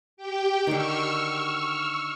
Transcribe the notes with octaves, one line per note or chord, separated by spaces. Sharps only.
G4 G5
D3 D#3 C#6 E6 F6